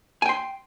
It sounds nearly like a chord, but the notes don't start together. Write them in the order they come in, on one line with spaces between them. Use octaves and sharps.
G#5 G5 C6